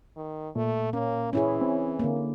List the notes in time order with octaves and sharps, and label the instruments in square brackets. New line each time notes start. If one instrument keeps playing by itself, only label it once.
[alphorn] D#3
[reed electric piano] A#2 [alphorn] A3
[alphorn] A#3 [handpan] C#4
[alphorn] E3 [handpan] C#4 E4 G#4
[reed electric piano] C4
[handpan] D3 A#3